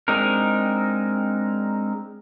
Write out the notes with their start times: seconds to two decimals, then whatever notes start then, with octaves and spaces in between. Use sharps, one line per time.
0.08 G#3 C4 D4 D#4 A#4